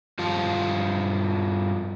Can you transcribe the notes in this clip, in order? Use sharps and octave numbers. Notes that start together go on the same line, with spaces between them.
G2 F3 F4